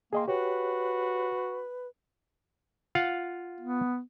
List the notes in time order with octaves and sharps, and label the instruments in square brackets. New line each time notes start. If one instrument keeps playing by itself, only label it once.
[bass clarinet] A#3 [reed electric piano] G#4 D#5 C6 [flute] G5
[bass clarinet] F#4 [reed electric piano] G4 C#5 [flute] B4
[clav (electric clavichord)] F4 F5 F#5
[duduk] B3